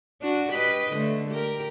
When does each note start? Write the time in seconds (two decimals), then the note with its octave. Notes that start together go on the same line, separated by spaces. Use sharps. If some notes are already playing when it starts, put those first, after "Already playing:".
0.22 D4 F#4
0.52 G4 B4 D#5
0.92 D3 A3
1.30 G4 A#4